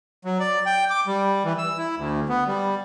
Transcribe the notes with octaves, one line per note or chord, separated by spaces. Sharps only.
F#3
D5
G5
D6
G3
E3
E6
E4
D2
B3
G3